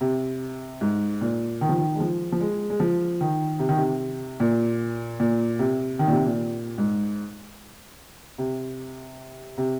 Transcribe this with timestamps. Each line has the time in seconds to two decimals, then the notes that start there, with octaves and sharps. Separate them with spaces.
0.01 C3
0.81 G#2
1.21 A#2
1.61 D#3
1.69 F3
1.77 D#3
1.96 G#3
2.00 F3
2.32 F3
2.41 G#3
2.70 G#3
2.80 F3
3.21 D#3
3.59 C3
3.69 D#3
3.77 C3
4.40 A#2
5.20 A#2
5.59 C3
5.99 D#3
6.07 A#2
6.12 C3
6.26 A#2
6.78 G#2
8.38 C3
9.58 C3